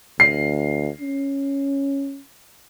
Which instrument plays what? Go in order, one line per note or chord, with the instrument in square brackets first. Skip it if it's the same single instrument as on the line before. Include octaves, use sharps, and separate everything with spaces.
[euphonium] D2 [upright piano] C7
[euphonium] C#4